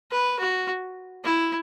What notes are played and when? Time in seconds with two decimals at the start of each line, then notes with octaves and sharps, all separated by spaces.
0.11 B4
0.39 F#4
1.24 E4